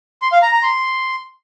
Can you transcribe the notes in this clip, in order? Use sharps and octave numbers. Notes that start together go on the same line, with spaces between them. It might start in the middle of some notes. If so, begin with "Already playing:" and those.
C6
F5
A#5
A#5
C6